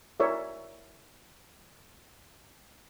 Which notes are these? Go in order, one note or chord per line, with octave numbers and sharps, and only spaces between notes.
E4 A#4 C#5 D5 E5